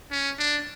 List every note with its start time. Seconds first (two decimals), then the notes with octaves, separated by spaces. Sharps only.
0.11 C#4
0.39 D4